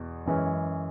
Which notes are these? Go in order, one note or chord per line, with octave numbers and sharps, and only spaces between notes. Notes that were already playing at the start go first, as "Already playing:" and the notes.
Already playing: E2 B2
F#2 E3 G#3 C#4